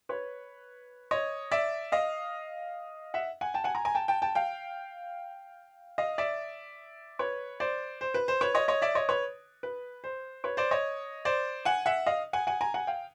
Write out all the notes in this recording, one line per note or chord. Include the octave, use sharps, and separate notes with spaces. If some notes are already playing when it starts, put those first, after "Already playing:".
B4 C#5
C#5 D#5
D5 E5
D#5 F5
E5 F#5
F#5 G#5
G5 A5
F#5 G#5
G#5 A#5
G#5 A#5
G5 A5
G5 A5
G5 A5
F5 G5
D#5 F5
D5 E5
B4 C#5
C5 D5
C5
B4
C5
B4 C#5
C#5 D#5
C#5 D#5
D5 E5
C#5 D#5
B4 C#5
B4
C5
B4 C#5
C5 D5
C#5 D#5
C5 D5
F#5 G#5
E5 F#5
D#5 F5
F#5 G#5
F#5 G#5
G#5 A#5
F#5 G#5
F5 G5